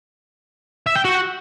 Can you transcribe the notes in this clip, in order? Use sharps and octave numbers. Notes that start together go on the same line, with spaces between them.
E5
G5
F#4